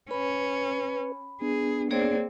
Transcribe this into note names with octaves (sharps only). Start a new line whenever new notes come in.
C#4 B4 B5
B3 D4 G#4
A#3 C4 G#4 C#5 D5